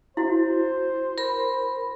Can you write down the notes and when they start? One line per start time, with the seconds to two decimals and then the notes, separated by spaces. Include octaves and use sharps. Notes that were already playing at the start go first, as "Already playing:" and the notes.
0.17 E4 F#4 C5
1.18 A#4 B5